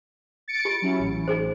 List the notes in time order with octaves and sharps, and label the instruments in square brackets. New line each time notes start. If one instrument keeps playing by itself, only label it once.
[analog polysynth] A6 C#7 D7
[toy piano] F4 G4
[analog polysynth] F#3 C#4 E4
A1
[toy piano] D#4 G#4 C5